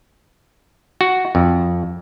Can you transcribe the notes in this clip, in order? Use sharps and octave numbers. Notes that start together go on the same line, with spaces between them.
F#4
F2